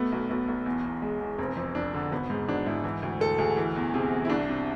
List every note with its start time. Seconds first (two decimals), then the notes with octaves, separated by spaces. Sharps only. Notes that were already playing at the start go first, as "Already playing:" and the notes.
Already playing: B2 A3 B3
0.12 B1
0.29 B1 B3
0.48 B1
0.66 E2
0.85 E2
1.02 G#3
1.21 E2
1.38 F1 C4
1.56 F2
1.75 F2 D4
1.94 D3
2.12 G#1 B3
2.30 G#2
2.48 G#1 D4
2.66 G#2 E4
2.84 E3
3.03 D2
3.20 D2 A4
3.38 D2 G#4
3.57 E3
3.76 E2
3.94 C3 G#4
4.12 E2
4.25 E4
4.30 C2 D4
4.49 C3